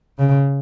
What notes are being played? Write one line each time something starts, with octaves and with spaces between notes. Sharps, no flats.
C#3